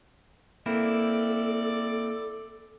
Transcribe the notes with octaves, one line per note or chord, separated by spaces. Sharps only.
A#3 C4 E4 A4 D5